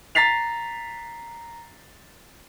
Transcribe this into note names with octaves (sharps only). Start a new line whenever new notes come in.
A#5 A6 B6 C7 F7